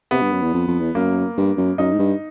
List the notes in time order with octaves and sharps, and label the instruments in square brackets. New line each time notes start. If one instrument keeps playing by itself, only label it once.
[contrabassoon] C3 [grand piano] B3
[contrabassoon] G2
F#2
E2
F2
F2
E2
[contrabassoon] F#2 [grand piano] A#3
[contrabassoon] G2
F#2
[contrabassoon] F#2 [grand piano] D#4
[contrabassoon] G#2
G2